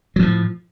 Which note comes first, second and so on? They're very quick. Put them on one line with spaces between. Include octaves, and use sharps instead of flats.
F#3 A2 F3